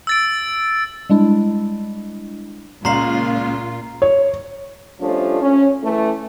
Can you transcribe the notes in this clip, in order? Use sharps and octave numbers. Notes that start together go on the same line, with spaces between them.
E6 A6 D7
G3 G#3 D4 E4
C#2 A#2 C#4 F4 F5 A#5 C6 C7
C#5
F3 G3 A3 C#4 D4
C#4
E3 A3